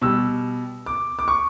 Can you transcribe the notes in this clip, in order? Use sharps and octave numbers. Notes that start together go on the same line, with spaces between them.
B2 G3 E6
D6
D6
C#6